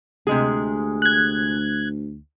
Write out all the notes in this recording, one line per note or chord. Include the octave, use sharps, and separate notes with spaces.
D2 C3 G#3 G#4
F#6 G#6